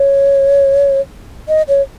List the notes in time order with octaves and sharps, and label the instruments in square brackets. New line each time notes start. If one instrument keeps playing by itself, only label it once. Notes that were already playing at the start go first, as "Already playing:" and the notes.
Already playing: [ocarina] C#5
D#5
C#5